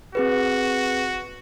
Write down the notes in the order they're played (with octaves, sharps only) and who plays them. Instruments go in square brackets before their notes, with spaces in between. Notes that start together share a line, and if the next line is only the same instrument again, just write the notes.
[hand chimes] C4 G#4 B4 [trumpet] F#4